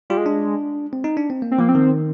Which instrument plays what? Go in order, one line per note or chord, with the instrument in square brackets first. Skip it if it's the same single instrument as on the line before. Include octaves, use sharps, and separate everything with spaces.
[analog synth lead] G3 [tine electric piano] F4
[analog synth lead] G#3
[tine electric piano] D4
C4
D#4
D4
C4
A#3
[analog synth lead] C4
[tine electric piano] F3 [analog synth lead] A#3
[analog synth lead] C4
[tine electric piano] D#3